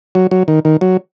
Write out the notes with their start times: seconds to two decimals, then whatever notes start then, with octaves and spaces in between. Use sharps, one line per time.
0.15 F#3
0.31 F#3
0.48 D#3
0.65 D#3
0.81 F#3